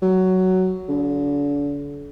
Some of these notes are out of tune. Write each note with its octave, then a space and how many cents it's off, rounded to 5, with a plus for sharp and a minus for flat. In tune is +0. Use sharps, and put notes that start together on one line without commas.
F#3 +10
D3 -40